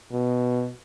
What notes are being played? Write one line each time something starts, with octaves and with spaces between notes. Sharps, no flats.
B2